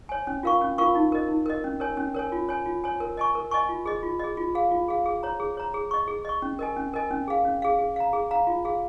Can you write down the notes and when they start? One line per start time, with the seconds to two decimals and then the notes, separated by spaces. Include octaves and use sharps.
0.09 C#5 G#5
0.27 C#4
0.43 F4 A#4 F5 C#6
0.61 C#4
0.78 F4 A#4 F5 C#6
0.95 D#4
1.12 A#4 D#5
1.29 D#4
1.46 A#4 D#5
1.64 C#4
1.80 A#4 C#5 G#5
1.97 C#4
2.14 A#4 C#5 G#5
2.32 F4
2.49 C#5 G#5
2.66 F4
2.84 C#5 G#5
3.00 A#4
3.17 D#5 G#5 C#6
3.35 A#4
3.51 D#5 G#5 C#6
3.69 F4
3.86 G#4 D#5
4.03 F4
4.19 G#4 D#5
4.37 F4
4.55 G#4 F5
4.71 F4
4.88 G#4 F5
5.06 G#4
5.23 C#5 A#5
5.40 G#4
5.57 C#5 A#5
5.74 G#4
5.91 D#5 C#6
6.08 G#4
6.25 D#5 C#6
6.42 C#4
6.59 A#4 D#5 G#5
6.77 C#4
6.93 A#4 D#5 G#5
7.11 C#4
7.28 G#4 F5
7.45 C#4
7.62 G#4 F5
7.79 G#4
7.96 F5 A#5
8.13 G#4
8.31 F5 A#5
8.47 F4
8.65 G#4 F5